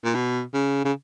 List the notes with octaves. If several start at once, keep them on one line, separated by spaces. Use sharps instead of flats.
A#2
B2
C#3
C#3